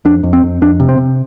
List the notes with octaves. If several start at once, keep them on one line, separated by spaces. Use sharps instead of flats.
F2 D4
F2
C4
F2
F2 D4
C3
C4
C3